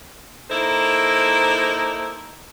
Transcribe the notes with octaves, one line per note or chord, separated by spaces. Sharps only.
A#3 D#4 E4 A4 C5